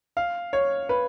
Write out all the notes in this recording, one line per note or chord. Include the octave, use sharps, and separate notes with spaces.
F5
C#5
B4